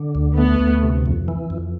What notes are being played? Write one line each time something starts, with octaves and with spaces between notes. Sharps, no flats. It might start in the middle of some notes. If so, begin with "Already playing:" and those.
Already playing: D3
D2
A3 B3
D2
C3
F2
E3
F2